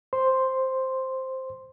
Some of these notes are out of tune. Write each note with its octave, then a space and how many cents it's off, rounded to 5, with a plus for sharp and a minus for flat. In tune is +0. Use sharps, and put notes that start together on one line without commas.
C5 +5 C6 +0